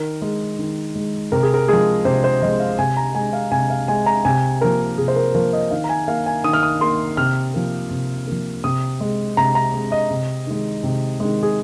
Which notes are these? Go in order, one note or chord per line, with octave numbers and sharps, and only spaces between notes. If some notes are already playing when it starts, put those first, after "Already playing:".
Already playing: D#3 A#4
G#3
D#3
G#3
C3 A#4
G#4
A#4
F3 G#3 G#4
C3 C5
C5
F3 G#3 D#5
F5
C3 G#5
A#5
G#3 G#5
F5
C3 G#5
F5
G#3 G#5
A#5
C3 G#5
F3 A#3 A#4
C3 G#4
C5
A#4
F3 A#3 A#4
D#5
D#3 F5
A#5
G#5
A#3 F5
G#5
D#3 D#6
F6
D#6
A#3 C6
C3 F6
F3 A#3
C3
F3 A#3
C3 D#6
G#3
C3 A#5
A#5
G#3
D#5
C3
D#3 G#3
C3
D#3 G#3
G#4